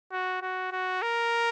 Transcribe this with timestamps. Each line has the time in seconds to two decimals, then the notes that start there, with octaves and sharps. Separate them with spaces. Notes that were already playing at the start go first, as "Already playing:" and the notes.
0.12 F#4
0.42 F#4
0.72 F#4
1.02 A#4